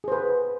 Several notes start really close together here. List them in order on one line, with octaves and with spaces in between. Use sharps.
G#4 C5 B4